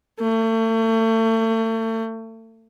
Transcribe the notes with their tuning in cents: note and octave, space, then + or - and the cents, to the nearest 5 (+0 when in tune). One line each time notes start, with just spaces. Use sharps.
A3 +35